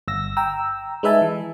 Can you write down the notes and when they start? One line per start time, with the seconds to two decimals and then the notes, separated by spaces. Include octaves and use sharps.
0.08 G1 E6 A#6
0.37 G5 A#5 E6
1.03 G#3 D#4 B4 E5 G#5 A5
1.22 E3